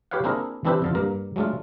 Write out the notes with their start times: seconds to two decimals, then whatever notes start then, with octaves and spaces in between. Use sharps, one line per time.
0.11 G4 B4 C#5 F5 F#5
0.24 A#3 C4 D4 E4 G#4 A#4
0.65 E3 C4 D4 E4 G4 B4
0.82 F2 D3 F4
0.95 G2 A#3 A#4
1.36 F#3 G#3 A3 D4 F4